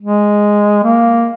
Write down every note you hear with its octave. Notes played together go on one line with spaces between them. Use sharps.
G#3
A#3